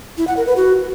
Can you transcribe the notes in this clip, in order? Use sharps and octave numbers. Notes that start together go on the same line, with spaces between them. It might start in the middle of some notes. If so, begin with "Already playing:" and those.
E4
F#5
A#4
B4
F#4